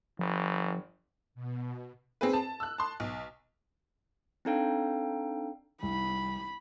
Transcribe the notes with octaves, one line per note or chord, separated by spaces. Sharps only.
G1 F3
B2
C4 G#4 B4
A5
E6 F#6
A5 C6
B1
C4 D4 D#4 A4 F5 G5
C2 B5